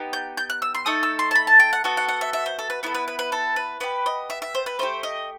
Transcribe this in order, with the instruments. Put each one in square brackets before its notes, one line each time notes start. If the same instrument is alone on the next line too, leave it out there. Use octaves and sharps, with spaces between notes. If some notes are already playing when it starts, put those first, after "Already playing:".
Already playing: [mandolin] B3 D#4 G4
G6
G6
F#6
E6
C6
A3 D#4 A4 D#6
E6
C6
A5
B5
A5
G5
F#5
B3 F#4 A4 F#5
F#5
F#5
E5
E5
C5
A4
B4
B3 E4 A4 B4
B4
B4
B4
A4
B4
B3 D#4 G4 B4
D#5
E5
E5
C5
B4
A3 D#4 G4 C5
D#5